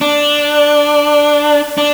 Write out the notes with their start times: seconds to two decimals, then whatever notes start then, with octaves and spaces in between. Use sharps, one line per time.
0.01 D4
1.78 D4